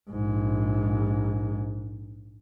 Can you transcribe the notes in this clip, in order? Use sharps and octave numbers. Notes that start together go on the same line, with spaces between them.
A#1 G#2